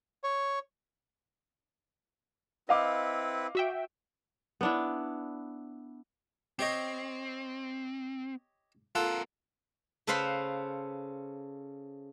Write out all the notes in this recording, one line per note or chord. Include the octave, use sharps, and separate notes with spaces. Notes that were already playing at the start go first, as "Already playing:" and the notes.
C#5
C4 E4 B4 D#5 F5 D6
F#4 E5 G5
B3 D4 E4
C4 G4 C#5 D#5
B3 F4 A4 A#4 F#5
C#3 A4 B4 C5 F5 B5